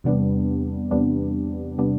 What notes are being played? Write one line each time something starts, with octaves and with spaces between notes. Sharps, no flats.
E2 C3 G3 B3 D4
E2 C3 G3 B3 D4
C3 G3 B3 D4